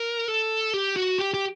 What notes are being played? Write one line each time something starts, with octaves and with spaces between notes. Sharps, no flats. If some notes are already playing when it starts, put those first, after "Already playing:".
Already playing: A#4
A4
G4
F#4
G4
G4